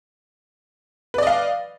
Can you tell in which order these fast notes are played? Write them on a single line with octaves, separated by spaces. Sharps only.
B4 D5 D#5 F5